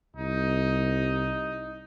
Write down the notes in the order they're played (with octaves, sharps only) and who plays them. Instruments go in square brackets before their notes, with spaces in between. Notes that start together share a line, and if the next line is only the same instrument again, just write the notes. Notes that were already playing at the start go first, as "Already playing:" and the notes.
[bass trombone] C2 [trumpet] D#4